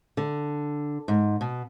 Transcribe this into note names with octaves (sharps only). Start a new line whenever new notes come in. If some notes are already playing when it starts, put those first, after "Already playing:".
D3
G#2
B2